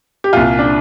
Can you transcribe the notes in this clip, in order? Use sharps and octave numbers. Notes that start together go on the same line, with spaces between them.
G4
C2 A#2 F4
D4